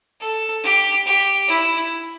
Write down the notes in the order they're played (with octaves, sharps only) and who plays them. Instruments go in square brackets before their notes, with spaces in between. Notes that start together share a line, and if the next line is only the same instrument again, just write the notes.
[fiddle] A4
G4
G4
E4